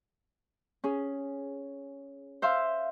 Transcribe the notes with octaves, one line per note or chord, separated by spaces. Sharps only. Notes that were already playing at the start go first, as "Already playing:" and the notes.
C#4 G#4
C5 E5 F5 C6